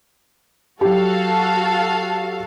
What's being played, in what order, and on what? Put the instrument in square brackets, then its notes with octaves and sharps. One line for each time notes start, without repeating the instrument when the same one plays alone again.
[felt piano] F#3 G4 [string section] F#4 A4 F5